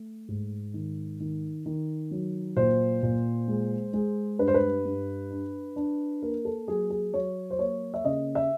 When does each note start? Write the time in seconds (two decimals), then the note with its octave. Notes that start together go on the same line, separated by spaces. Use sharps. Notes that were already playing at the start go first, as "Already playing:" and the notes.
Already playing: A3
0.28 G#2
0.74 D#3
1.20 D#3
1.66 D#3
2.11 F#3
2.57 A#2 C5
3.03 A#2
3.48 G#3
3.93 G#3
4.39 G2 B4
4.48 C5
4.54 B4
4.85 G2
5.30 D4
5.76 D4
6.22 A#3 A#4
6.45 A4
6.68 F#3 G#4
6.90 G#4
7.14 F#3 C#5
7.50 C5
7.59 A#3 C#5
7.94 E5
8.05 C#3 D#5
8.35 E5